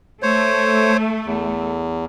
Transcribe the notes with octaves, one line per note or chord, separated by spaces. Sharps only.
A3 C5 C#5
E2